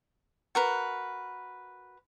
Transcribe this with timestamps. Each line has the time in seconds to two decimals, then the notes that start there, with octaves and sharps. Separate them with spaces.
0.55 F#4 A#4 B4